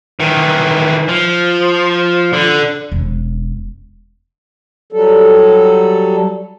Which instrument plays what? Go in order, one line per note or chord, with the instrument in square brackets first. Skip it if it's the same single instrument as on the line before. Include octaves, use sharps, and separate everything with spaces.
[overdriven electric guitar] D#3 E3
F3
D3
[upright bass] E1 C#4
[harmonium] F#3 G3 A4